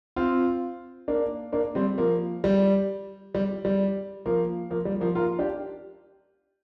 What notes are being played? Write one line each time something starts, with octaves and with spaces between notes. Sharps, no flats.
C4 F4
A#3 D4
A#3 D4
G3 C4
F3 A#3
G3
G3
G3
F3 A#3
F3 A#3
G3
F3 A#3
F4 A#4
D4 G4